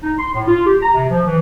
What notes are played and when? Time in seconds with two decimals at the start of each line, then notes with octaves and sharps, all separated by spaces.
0.03 D#4
0.19 C6
0.34 A2
0.47 F4
0.66 G4
0.83 A#5
0.94 C3
1.10 F3
1.26 E3